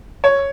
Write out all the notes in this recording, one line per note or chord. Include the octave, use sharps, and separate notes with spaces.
C#5